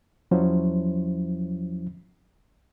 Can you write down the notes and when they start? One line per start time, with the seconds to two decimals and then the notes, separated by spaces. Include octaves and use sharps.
0.31 E2 F3 F#3 C#4 E4 C5